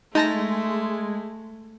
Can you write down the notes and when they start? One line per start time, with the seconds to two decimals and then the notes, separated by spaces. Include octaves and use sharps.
0.15 G#3 A3 D#4 A5 A#6